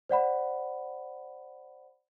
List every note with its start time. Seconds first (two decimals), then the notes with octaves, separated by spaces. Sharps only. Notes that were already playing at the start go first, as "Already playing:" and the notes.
0.09 C5 D5 F#5 B5